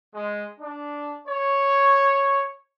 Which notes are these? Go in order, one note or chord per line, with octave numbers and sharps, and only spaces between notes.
G#3
D4
C#5